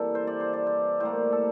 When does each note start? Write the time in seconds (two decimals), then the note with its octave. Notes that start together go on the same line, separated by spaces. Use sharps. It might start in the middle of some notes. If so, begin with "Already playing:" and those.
Already playing: C3 E3 G3 A#3 A4
0.15 C5
0.27 D5
0.40 C5
0.53 D5
0.67 C5
1.00 A2 G3 A#3 C5
1.32 A4